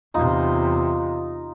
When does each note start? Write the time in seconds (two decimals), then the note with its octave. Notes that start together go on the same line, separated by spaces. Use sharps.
0.14 E2 C3 D#4 F4